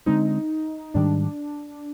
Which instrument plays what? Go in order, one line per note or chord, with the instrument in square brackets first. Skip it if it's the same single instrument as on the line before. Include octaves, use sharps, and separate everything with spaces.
[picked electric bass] D3 G#3 C4 [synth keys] D#4
[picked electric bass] G#2 D#3 G3 [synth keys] D4